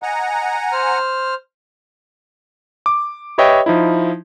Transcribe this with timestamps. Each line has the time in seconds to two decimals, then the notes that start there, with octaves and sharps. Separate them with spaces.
0.03 D#5 F#5 G#5 A#5
0.72 C5 F6
2.86 D6
3.38 G4 B4 C#5 D#5 E5 G5
3.66 F3 D#4 E4